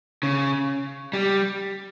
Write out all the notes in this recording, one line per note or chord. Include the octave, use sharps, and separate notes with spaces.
C#3
G3